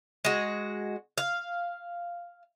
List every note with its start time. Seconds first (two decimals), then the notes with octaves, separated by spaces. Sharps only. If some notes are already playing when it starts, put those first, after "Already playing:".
0.25 G#3 F#4
1.18 F5